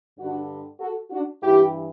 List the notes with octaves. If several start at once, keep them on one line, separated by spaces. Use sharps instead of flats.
G2 D3 D4 F#4
F#4 A4
D4 F#4
G2 E3 E4 G4